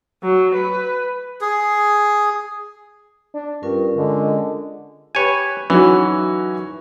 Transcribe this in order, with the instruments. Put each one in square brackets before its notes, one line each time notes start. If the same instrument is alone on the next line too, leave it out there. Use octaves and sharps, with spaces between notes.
[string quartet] F#3
B4
[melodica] G#4
[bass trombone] D4
[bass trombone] G2 [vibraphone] C#4 F4 A#4
[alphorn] D3 [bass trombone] G#3
[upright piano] G4 B4 [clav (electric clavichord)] C#5 G#5
[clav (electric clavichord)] E3 [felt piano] F#3 D#4 F#4 [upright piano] C#4 E4